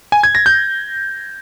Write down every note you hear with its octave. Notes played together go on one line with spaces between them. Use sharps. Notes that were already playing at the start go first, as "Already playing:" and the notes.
G#5
G#6
A#6
G6